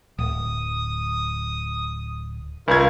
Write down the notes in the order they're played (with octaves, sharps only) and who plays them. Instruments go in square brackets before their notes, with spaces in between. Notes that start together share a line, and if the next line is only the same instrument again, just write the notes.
[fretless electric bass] D1 [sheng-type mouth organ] D#6
[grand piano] C#2 G#6 [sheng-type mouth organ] F4 A#4